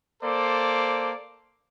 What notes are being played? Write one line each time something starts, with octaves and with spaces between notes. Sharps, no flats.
A#3 A4 C5 D5